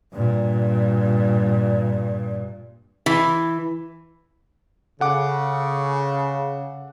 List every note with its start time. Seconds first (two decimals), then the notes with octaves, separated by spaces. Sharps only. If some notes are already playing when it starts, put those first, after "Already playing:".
0.13 G2 A#2
3.06 E3
5.00 C#3 A4 F#5 D6